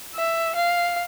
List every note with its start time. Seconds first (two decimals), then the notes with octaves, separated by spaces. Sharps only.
0.15 E5
0.55 F5